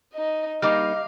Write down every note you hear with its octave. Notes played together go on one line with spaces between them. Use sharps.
D#4 D#5
G3 A#3 D#4 D#5 F5 D6 F6